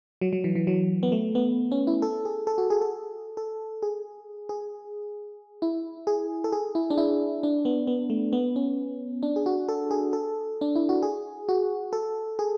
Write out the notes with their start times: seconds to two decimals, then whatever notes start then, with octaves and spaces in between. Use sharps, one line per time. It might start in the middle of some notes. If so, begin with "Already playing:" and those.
0.21 F#3
0.33 F#3
0.44 E3
0.55 E3
0.67 F#3
1.03 B3
1.12 A3
1.35 B3
1.72 C#4
1.87 E4
2.02 A4
2.25 G#4
2.47 A4
2.58 F#4
2.70 G#4
2.81 A4
3.37 A4
3.82 G#4
4.49 G#4
5.62 E4
6.07 G#4
6.44 A4
6.52 G#4
6.75 E4
6.90 D4
6.98 E4
7.43 D4
7.65 B3
7.87 B3
8.10 A3
8.33 B3
8.56 C#4
9.23 D4
9.36 G#4
9.46 F#4
9.69 A4
9.91 G#4
10.13 A4
10.61 D4
10.75 E4
10.89 F#4
11.02 G#4
11.49 F#4
11.93 A4
12.39 G#4